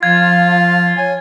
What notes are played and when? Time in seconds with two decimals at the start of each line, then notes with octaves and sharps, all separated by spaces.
0.03 F3 F4 F5 G#6
0.97 C#5 G#5